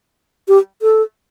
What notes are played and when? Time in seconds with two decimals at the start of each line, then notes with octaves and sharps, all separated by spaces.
0.48 G4
0.82 A4